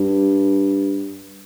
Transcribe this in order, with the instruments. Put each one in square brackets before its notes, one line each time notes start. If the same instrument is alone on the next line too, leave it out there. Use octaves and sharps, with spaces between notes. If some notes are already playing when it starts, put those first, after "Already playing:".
Already playing: [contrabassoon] G2